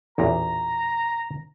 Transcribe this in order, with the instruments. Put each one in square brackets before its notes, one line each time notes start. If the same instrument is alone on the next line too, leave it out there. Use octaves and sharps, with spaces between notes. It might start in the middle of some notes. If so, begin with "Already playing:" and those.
[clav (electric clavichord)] A1 E2 A#2 [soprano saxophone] A#5